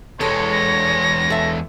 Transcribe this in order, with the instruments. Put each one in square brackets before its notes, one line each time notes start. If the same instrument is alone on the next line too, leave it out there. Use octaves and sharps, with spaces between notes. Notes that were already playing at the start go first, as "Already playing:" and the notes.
[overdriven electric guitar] E2 G#3 [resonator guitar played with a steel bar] A4 [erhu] C#5
[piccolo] A#6
[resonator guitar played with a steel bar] A4 E5